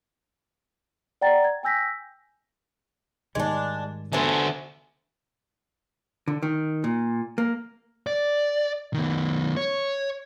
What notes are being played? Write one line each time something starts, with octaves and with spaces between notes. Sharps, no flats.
D5 F#5 G5 A#5 A6
G#6
G5 G#5 E6 G6 A#6 B6
G#2 D#3 G3 G#3 D4
D3 B3 C5 E5 G#5 A5
D3
D#3
A#2
A#3
D5
D#3 B3
C#5